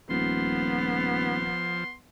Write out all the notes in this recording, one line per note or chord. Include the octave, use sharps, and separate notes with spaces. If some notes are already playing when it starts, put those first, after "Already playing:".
D#1 F3 B3 C6